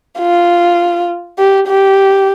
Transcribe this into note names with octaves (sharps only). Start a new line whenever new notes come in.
F4
G4
G4